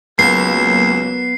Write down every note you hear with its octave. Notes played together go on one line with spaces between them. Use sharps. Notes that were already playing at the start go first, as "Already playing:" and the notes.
C#2 F#3 A#3 B3 C7 E7